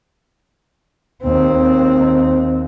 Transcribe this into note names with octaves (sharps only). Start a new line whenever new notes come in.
D#2 C4